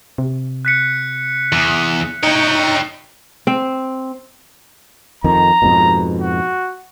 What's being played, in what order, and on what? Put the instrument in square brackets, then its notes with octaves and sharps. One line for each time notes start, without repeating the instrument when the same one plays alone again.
[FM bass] C3
[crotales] F#6 B6 C#7
[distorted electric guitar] E2 [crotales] C#7
[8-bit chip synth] D#4 [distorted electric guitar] C#5 G5
[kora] C4
[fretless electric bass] F2 D#3 [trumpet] A#5
[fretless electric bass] F2 G#2 B2
[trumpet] F#4